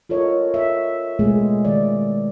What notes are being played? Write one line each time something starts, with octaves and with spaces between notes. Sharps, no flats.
F4 A4 A#4 C#5 D#5
E5
B2 G#3 A3 B3 G#4
D#3 D5